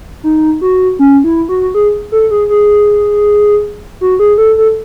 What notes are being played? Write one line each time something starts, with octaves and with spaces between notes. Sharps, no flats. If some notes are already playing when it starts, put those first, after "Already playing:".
D#4
F#4
C#4
E4
F#4
G#4
A4
G#4
G#4
F#4
G#4
A4
A4